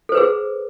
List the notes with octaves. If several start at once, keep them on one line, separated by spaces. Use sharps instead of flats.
G#4 A4 B4 C5